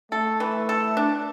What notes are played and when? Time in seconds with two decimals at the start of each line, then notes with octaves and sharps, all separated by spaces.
0.12 A3 A4
0.40 E3
0.69 A4
0.97 D4